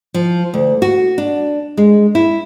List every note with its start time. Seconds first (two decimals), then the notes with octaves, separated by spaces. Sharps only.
0.14 F3
0.54 D2
0.82 F#4
1.18 D4
1.77 G#3
2.15 E4